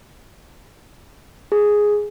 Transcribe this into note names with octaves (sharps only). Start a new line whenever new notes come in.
G#4